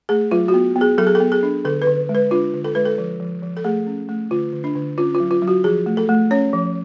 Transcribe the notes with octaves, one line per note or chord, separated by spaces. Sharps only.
A3 G#4
F#3 F4
F#4
B3
B3
G#4
F#3 A4
G#4
A4
B3
G#4
D4
D3 A4
B4
D3
G#3
B4
D4 F4
D3
A4
G#3 B4
A4
F3
F3
F3
A4
A3 G#4
C#4
A3
D3 F4
D3
D4
D3
C#4 F4
F4
F#3
F4
F#3
F#4
F3 G#4
A3
A4
A3
C#4 C#5
F3